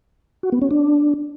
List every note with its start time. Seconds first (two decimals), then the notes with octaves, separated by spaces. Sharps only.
0.43 F#4
0.52 B3
0.62 C#4
0.71 D4